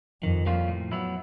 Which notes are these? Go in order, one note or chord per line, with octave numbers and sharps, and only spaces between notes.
F2 D#3
G3 A#3 C#4 F4
A2
F#3 B3 E4